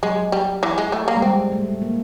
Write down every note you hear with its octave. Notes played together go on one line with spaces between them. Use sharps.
F#3 G#3
G3
E3
G#3
A3
A#3
G#3
G3 C4
A3
A#3